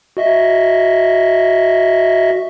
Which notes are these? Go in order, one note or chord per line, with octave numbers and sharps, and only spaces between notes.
F#4 D#5 E5